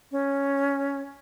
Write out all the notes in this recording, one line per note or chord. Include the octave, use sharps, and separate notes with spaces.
C#4